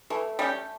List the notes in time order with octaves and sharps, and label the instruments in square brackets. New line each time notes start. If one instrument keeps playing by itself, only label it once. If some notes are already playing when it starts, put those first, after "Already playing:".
[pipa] E3 [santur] A3
[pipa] G3 C#4 G4